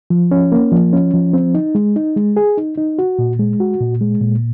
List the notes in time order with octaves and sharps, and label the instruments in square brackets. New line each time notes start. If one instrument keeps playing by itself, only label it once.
[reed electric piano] F3
C#4
A#3
F3
C#4
F3
C4
D#4
G#3
D#4
G#3
G#4
D#4
D#4
F#4
A#2
G#3
F#4
A#2
G#3
A#2